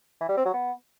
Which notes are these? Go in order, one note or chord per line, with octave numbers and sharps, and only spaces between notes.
E3
G3
C4
F#3
B3